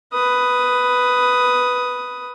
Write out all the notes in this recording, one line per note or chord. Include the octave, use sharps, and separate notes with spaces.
B4 D#6